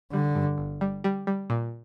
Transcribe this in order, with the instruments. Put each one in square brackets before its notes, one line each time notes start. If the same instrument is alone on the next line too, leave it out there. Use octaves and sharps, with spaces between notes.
[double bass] D3 [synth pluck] G3
[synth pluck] G2
G1
G3
G3
G3
A#2